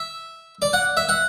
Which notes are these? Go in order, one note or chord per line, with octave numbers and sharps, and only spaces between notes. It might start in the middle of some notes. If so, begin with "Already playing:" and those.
Already playing: E5
D5
F#5
E5
F#5